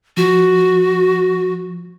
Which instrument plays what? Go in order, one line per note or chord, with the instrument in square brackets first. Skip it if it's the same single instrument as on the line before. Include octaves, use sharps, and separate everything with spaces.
[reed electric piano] F3 [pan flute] F#4